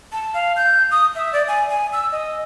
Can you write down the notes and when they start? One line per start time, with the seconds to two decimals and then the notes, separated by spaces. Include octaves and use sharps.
0.12 A5
0.34 F5
0.57 G6
0.91 D#6
1.15 E5
1.33 D5
1.48 G#5
1.69 G#5
1.93 E6
2.12 D#5